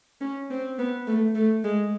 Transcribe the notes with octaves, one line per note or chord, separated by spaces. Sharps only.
C#4
C4
B3
A3
A3
G#3